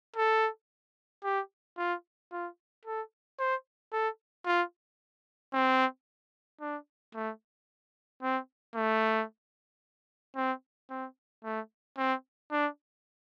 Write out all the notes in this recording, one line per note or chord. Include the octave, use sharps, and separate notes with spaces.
A4
G4
F4
F4
A4
C5
A4
F4
C4
D4
A3
C4
A3
C4
C4
A3
C4
D4